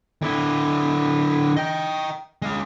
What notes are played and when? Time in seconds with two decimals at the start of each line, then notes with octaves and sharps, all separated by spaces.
0.22 D3 E4
1.57 D#5 G5
2.42 G#3 F5